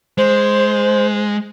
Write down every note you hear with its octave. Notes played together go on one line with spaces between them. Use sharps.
G#3 C5